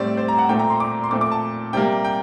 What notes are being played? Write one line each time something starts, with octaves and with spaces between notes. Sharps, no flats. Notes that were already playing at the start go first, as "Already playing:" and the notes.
Already playing: A2 G3 C4 D5
C5
A#5
F#5
A#2 A3 C4 G5
A#5
C6
D6
C6
A#2 A3 C4 D6
D6
A5
C3 G3 A#3 G5
G5